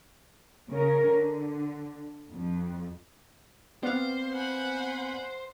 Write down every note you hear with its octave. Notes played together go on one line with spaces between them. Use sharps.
C#3 C#4 A#4
D3
F2
B3 C4 C5 D5 F5
F#5 G#5 B5